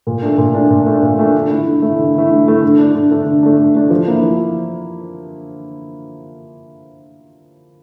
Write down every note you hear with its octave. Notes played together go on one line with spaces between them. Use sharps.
A#2
A3 D4
A#2
A3 D4
A#2
A3 D4
A#2
A3 D4
D3
A3 E4
D3
A3 E4
D3
A3 E4
D3
A3 E4
D3
A3 D4
D3
A3 D4
D3
A3 D4
D3
A3 D4
F3
A#3 E4
F3